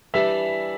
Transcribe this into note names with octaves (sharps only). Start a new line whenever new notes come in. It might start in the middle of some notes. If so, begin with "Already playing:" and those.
E3 G3 D4 E5